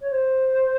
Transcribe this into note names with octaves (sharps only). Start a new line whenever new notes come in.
C#5
C5